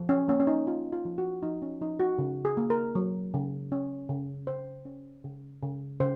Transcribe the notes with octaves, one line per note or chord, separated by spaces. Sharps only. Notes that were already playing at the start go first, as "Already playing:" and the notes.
Already playing: F3
C#4
A#3 C#4
C#4
D#4
C#4 F4
F4
F3
F#4
F3 D#4
C#4
F3 D#4
F#4
C#3
G#4
A#3
A#4
F#3
C#3
C#4
C#3
C#3 C5
C#4
C#3
C#3
C#3 C5